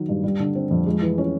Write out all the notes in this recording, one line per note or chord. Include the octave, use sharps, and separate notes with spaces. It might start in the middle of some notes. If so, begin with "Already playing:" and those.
Already playing: D#3 F#3
G2
G3
D3
C4
F2
G#3
E3
C#4